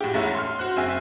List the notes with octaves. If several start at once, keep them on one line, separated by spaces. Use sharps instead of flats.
A2 F#4 G4
E2 G#2 A3 C#4 E4 F#5
C6 F6
F#4 C5 F#6
F#1 C4 E5 G#5